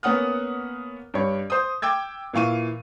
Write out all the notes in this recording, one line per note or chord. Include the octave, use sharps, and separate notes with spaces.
A#3 B3 C#4 F#5 D#6 F6
G2 C#5
C5 D#6
G5 D6 E6 G#6
A#2 E3 F5 C#6 D#7